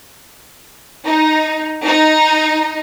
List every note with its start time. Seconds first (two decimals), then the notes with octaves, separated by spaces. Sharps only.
1.05 D#4
1.85 D#4